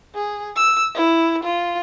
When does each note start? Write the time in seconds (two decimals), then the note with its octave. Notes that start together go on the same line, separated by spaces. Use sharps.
0.15 G#4
0.56 E6
0.95 E4
1.43 F4